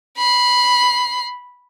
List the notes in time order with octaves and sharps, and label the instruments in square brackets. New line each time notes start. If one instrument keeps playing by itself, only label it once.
[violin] B5 C7